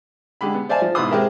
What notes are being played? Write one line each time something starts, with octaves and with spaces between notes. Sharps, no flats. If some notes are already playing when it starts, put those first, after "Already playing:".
D3 G#3 G4 B5
B3
C5 D5 E5 F5 G#5 A5
F3
G#2 B2 E4 B4 C6 D#6
G#3 C4 G4 G#4 A#4 E5